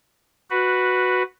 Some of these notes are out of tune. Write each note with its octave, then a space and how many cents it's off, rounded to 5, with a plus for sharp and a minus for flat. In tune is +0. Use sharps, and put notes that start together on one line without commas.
F#4 -5 B4 +0